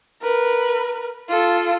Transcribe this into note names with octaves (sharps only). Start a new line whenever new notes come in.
A#4 B4
F4 A4